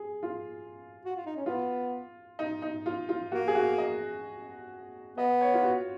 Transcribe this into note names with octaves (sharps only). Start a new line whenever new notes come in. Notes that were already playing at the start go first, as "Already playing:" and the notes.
Already playing: G#4
F4
F#4
F4
D#4
C#4
B3 F4
D#4
D#4
F4
F4
A#3 F#4
G#4
F#4
D#5
B3 D#5
C#5
F4
F#4